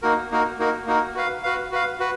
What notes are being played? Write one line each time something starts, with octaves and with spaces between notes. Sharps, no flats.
A#3 D#4 F#4 A#4
A#3 D#4 F#4 A#4
A#3 D#4 F#4 A#4
A#3 D#4 F#4 A#4
F#4 B4 F5
F#4 B4 F5
F#4 B4 F5
F#4 B4